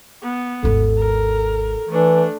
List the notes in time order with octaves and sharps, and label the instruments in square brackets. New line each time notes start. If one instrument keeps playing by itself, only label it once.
[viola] B3
[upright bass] G#1 D#2 [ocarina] A4
[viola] A#4
[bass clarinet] E3 [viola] A3 D4